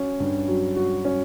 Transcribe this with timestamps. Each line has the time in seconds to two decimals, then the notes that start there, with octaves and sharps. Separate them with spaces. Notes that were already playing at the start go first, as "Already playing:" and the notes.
Already playing: C#4 F#4
0.20 G2
0.48 F#3
0.76 F#4
1.05 C#4